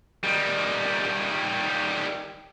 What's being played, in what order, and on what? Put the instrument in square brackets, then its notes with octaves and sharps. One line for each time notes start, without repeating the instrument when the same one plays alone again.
[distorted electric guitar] D#3 G3